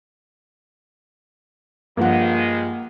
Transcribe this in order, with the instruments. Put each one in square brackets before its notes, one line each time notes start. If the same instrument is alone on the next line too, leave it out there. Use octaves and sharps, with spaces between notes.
[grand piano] G2 F3 [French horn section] D#3 G#3 [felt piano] A#3 F#5